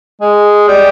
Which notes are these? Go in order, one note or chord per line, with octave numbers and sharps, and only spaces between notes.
G#3
G3